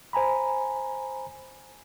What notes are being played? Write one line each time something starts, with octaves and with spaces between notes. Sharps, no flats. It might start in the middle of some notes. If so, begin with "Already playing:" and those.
C5 G#5 A#5 B5